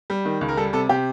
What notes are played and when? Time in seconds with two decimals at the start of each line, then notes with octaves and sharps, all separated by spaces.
0.10 G3
0.25 D#3
0.41 C#2
0.49 A#4
0.57 G3 A4
0.73 C3 A4
0.89 C3 G4